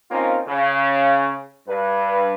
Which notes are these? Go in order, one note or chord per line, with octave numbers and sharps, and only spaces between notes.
A#3 C4 C#4 D#4 F4
C#3
G2 B4